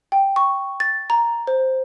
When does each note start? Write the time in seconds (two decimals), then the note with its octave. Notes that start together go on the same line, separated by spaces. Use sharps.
0.12 G5
0.36 C#6
0.80 A6
1.10 A#5
1.47 C5